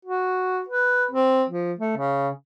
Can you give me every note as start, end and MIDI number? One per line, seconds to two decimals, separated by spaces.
0.05 0.61 66
0.69 1.06 71
1.11 1.44 60
1.50 1.73 53
1.79 1.93 57
1.97 2.30 49